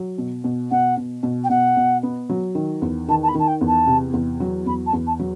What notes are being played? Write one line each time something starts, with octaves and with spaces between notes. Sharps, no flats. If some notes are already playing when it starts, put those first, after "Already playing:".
Already playing: F#3
B2
B2
B2 F#5
B2
B2
G5
B2 F#5
B2
B3
F#3
D#3
E2
D#3 A5
A5
B5
D#3 A5
G5
E2
A5
C3
E2
F#3
E2 B5
A5
E2
A5
F#3